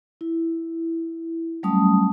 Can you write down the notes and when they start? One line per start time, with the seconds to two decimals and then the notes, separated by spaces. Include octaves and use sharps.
0.21 E4
1.63 F#3 G3 A3 C#4 A5 D#6